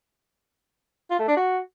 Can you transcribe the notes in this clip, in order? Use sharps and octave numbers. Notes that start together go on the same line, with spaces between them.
F4
A3
D4
F#4